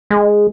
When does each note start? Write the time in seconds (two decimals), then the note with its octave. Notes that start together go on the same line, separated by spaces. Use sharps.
0.11 G#3